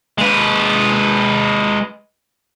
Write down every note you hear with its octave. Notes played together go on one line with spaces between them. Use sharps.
G#3 B4